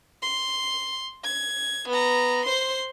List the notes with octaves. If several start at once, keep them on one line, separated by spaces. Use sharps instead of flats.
C6
G#6
B3 A#5
C5 C6